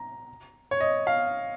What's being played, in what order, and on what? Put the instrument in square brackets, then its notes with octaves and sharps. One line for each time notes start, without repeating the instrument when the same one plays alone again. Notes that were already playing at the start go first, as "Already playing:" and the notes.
Already playing: [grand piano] A#5
C#5
D#5
F5